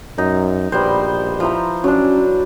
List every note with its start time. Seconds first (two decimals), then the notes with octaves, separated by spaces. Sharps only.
0.18 F#2 D#4
0.72 A#1 G3 B3 C5
1.40 F3 E4 A#5
1.84 F#3 C#4 D4